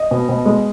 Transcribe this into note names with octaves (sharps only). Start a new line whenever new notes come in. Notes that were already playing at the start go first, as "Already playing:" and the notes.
Already playing: D#5
B2
B2
G#3